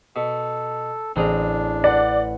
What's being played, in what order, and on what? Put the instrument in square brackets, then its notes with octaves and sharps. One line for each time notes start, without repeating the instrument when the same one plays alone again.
[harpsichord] B2 [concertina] A4
[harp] A1 [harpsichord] C4 G#4 A#4 [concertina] D4
[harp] B4 F#5 [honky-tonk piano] D5